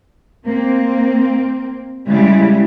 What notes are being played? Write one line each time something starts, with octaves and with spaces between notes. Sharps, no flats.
A#3 C4
C#3 G3 G#3 E4